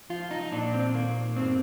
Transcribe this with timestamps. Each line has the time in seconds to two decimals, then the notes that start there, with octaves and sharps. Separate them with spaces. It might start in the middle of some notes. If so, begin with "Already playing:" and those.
0.10 F3 F4
0.31 D#4
0.52 A#2 D4
0.74 C4
0.94 D#3 A#3
1.36 G2 C4